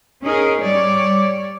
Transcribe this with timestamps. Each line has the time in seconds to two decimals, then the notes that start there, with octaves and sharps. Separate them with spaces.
0.22 C#4 D#4 G#4 A#4
0.61 G3 C#5 D5